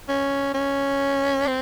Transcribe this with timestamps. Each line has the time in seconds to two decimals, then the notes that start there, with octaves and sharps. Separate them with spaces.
0.08 C#4
0.54 C#4
1.47 C4